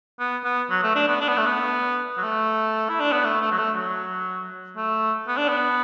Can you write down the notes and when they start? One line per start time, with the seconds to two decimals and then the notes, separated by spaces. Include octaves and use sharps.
0.20 B3
0.44 B3
0.70 F#3
0.83 A3
0.95 D4
1.08 B3
1.21 D4
1.29 B3
1.38 A3
1.46 B3
2.18 F#3
2.23 A3
2.89 E4
3.00 D4
3.12 B3
3.24 A3
3.41 A3
3.52 F#3
3.58 A3
3.75 F#3
4.77 A3
5.28 B3
5.38 D4
5.48 B3